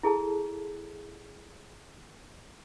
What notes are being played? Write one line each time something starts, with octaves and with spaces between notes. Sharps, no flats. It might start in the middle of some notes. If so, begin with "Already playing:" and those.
E4 G#4 A4 A5